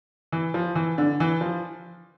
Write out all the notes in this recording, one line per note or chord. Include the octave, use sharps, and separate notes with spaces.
E3
F3
E3
D3
E3
F3